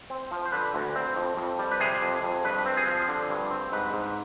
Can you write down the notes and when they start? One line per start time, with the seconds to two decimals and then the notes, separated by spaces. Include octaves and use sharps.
0.10 C4
0.31 F3
0.45 C5
0.52 D3 B4
0.75 D2
0.96 C4
1.16 F2
1.37 F2
1.59 G3
1.71 B4
1.80 C3 G#4
2.02 F2
2.23 F2
2.45 G2 B4
2.66 C4
2.77 G#4
2.87 F3
3.09 D3
3.30 G2
3.51 C4
3.72 G#2 B4
3.94 G#2